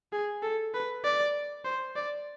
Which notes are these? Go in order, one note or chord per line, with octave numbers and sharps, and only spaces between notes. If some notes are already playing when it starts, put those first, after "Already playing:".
G#4
A4
B4
D5
C5
D5